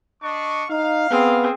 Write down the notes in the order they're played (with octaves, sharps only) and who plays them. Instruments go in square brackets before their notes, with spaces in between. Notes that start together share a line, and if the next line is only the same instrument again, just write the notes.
[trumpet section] D4 D#5 C#6
[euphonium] D#4 [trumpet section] F5
[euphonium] B3 [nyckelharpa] C4 G#4